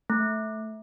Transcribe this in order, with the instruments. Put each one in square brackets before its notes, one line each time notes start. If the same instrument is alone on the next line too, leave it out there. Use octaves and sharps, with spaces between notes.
[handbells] A3